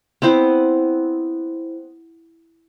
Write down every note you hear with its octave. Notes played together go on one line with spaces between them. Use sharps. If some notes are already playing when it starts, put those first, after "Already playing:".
B3 C4 E4 C5